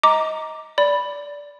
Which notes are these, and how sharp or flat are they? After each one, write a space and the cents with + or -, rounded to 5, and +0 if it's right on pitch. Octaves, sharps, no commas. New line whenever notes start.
D#5 +20 A#5 +0 D6 +0
D5 -15 B5 +0